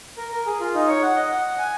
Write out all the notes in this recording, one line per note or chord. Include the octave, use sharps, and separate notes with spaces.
A#4
A#4
G#4
F4
D#4
C#5
F#5
D#5
F#5
G#5